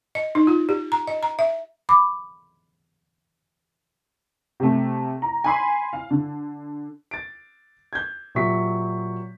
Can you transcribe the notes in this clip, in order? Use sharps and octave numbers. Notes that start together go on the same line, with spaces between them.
D#5
D#4
F4
G4
A#5
D#5
A#5
E5
B5 D6
C3 A3
A#5
G#5 B5 C6
F5
D3
A6 D7
G6 G#6
A#2 F#3 G4 E5 C#6 B6